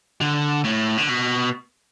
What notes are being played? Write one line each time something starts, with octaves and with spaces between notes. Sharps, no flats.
D3
A2
D3
B2